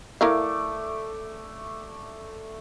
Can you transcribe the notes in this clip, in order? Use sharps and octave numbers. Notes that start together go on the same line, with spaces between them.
A3 E4 A#4 D5 F5